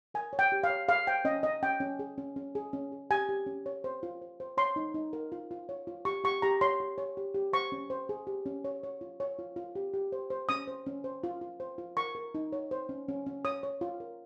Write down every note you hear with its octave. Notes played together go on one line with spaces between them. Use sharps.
A#4 G#5
C#5
G5
G4
F5
C#5
G#4 F5
C5 G5
C#4 D#5
C#4 D#5
C#4 G5
C#4
G#4
C#4
C#4
G#4
C#4
G#4
G4 G#5
G4
C#4
C#5
C5
F4
C5
C5
C#5 C6
D#4
D#4
A#4
F4
F4
C#5
F4
G4 C#6
G4 C#6
G4 A#5
C#5 C6
G4
C#5
G4
G4
C5 C#6
C#4
C5
G#4
G4
C#4
C#5
C#5
F4
C#5
F4
F4
G4
G4
C5
C5
C#4 D#6
C5
C#4
C5
F4
F4
C5
F4
A#4 C#6
A#4
D#4
C#5
C5
C#4
C#4
C#4
C#5 D#6
C#5
F4
A#4